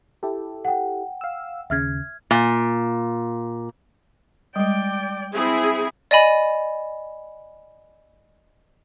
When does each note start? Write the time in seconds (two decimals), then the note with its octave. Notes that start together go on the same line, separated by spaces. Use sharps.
0.23 E4 G4 A4
0.65 F#5 G5
1.21 F5 E6
1.70 D#2 C#3 E5 F6 G#6
2.31 A#2
4.56 G3 G#3 D5 G5
5.34 C4 E4 G#4
6.11 D5 D#5 G#5 B5